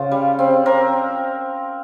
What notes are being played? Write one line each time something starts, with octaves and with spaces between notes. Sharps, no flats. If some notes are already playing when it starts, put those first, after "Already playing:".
Already playing: C#3 F4
G3
C4
C4 A#4